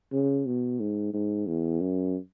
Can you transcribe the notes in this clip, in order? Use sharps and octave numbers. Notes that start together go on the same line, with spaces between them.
C#3
B2
G#2
G#2
E2
F#2